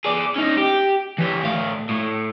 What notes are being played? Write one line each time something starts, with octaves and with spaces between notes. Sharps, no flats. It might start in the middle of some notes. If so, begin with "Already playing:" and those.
G#4 D5
C#4 D#4
G4
E3 G4
A2 F5
A2